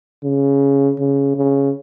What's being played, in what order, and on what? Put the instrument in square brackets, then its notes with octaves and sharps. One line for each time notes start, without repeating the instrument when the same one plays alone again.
[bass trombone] C#3
C#3
C#3